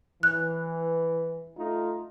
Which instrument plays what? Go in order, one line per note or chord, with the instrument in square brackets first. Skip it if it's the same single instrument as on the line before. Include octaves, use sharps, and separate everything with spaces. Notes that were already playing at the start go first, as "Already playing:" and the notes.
[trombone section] E3 [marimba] F#6
[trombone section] A3 D#4 F4